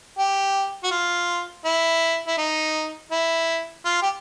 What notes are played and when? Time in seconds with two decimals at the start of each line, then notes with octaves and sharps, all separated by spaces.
0.18 G4
0.84 F#4
0.91 F4
1.65 E4
2.27 E4
2.38 D#4
3.11 E4
3.85 F4
4.02 G4